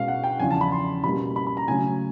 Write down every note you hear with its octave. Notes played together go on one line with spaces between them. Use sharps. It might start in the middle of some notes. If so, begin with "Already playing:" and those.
Already playing: B2 G#3 C#4 F5
F#5
G5
E2 C#3 F3 G#5
A5
B5
C6
B2 G3 A#3 C#4 B5
B5
B5
A#5
C#3 F#3 A3 G#5